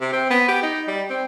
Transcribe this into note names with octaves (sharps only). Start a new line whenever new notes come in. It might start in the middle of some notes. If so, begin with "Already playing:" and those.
C3
C4
B3
G4
D#4
G3
C4